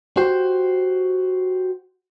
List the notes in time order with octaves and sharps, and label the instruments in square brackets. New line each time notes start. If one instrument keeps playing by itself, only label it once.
[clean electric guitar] F#4 G4 C5